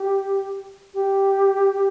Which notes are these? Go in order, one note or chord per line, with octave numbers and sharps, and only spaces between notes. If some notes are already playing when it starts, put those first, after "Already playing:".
Already playing: G4
G4